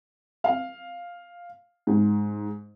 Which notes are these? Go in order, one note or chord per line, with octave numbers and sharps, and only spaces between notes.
F5
G#2